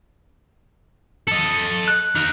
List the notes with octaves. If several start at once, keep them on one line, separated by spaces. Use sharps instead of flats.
A4 D#5
F#6
D#4 F5